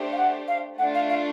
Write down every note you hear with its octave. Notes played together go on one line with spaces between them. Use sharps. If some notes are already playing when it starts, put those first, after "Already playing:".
Already playing: A3 D4 G4 C5
F5
F#5
F5
A3 D4 F4 F#5
F5
F5